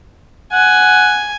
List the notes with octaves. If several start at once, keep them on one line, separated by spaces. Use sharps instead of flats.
F#5 G#5